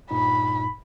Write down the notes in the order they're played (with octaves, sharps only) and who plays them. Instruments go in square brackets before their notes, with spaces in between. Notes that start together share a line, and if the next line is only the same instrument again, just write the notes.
[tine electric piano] G2 A#2 D#4 [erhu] B5